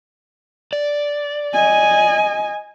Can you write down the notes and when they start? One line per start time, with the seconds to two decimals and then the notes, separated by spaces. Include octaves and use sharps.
0.73 D5
1.53 D#5 G#5